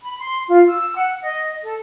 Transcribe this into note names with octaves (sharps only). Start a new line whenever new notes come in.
B5
C6
F4
E6
F#5
D#5
A4